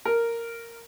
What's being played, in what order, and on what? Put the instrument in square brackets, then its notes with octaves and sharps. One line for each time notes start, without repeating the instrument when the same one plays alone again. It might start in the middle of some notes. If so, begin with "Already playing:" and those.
[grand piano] A#4